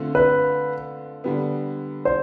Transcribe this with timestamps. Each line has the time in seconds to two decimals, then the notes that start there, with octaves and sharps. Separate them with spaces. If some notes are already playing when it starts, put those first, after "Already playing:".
Already playing: D3 A3 C4 F4
0.15 B4
1.24 D3 G3 B3
2.05 C5